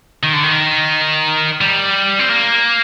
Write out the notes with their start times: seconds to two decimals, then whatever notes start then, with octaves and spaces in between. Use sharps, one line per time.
0.23 D#3
0.33 D3
0.43 D#3
1.61 G3
2.19 C4
2.29 A#3